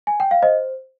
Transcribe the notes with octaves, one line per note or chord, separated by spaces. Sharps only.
G#5
G5
F5
C5 D#5